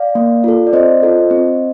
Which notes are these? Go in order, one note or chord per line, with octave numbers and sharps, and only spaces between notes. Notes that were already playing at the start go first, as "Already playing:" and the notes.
Already playing: D5 F5
A#3
F4 A4
D5
C4 C5 D#5
F4 A4
C4